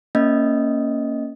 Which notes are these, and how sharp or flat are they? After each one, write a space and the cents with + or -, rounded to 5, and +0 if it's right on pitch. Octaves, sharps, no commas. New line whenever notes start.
A#3 +0 C#4 +0 D#5 -5